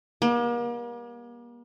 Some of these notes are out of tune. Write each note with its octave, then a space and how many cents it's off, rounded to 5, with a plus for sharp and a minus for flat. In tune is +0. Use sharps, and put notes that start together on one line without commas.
G3 +40 A#3 +40